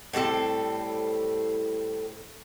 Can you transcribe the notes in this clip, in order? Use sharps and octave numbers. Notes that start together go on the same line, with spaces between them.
A2 G3 C4 A4